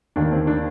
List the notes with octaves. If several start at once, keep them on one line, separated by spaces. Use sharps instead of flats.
D#2 D#3 D4
C4
D4